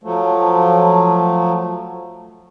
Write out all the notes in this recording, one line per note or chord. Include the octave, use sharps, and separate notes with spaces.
F3 F#3 A3